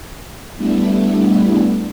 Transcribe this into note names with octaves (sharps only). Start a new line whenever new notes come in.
G3 A3 B3 D4 E4